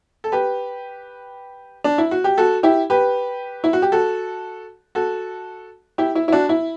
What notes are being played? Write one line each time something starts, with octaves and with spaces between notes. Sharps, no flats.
A4
G4 B4
D4
E4
F#4
G4
F#4 A4
E4 G4
G4 B4
E4
F#4
G4
F#4 A4
F#4 A4
E4 G4
E4
E4
D4 F#4
E4